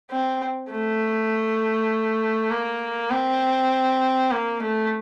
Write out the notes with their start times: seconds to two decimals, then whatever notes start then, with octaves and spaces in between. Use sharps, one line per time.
0.11 C4
0.71 A3
2.51 A#3
3.10 C4
4.31 A#3
4.60 A3